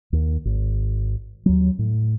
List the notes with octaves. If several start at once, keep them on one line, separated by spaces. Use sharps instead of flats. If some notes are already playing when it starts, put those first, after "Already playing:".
D#2
G#1
D#2 F#3
A2